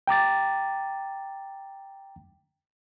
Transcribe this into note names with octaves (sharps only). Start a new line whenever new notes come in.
G5 A#5 D6 A6